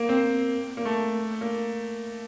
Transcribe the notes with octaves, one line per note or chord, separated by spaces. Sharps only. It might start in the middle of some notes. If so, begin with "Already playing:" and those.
Already playing: A#3
C4
A#3
A3
A#3